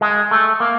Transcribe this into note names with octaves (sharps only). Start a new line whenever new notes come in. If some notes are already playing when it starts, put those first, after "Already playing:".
G#3
A3
A#3